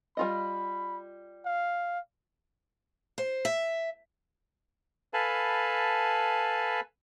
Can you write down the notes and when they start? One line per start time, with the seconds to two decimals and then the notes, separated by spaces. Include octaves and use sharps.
0.17 G3 F4 D#5 B5
1.45 F5
3.18 C5
3.45 E5
5.14 A4 B4 F5 G#5 A5 B5